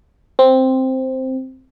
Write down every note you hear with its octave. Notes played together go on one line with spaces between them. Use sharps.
C4